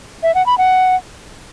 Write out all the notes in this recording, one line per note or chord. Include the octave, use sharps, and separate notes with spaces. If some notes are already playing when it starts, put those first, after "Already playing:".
E5
F#5
B5
F#5